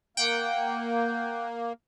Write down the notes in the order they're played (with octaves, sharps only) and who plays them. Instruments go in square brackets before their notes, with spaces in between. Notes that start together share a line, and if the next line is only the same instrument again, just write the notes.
[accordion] A#3 [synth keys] F#5 G5